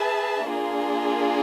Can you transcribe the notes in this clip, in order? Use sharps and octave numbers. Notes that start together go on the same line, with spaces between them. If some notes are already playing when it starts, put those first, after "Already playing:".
Already playing: G#4 B4 E5 A5
A#3 D4 F4 G#4